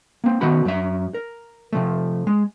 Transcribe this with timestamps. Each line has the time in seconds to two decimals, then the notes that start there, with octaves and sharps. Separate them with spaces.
0.24 A#3 C4
0.41 D#3 A3 B3 F#4 B5
0.65 F#2 F#3 A#4 E5
1.14 A#4
1.73 C3 F3 A3
2.27 G#3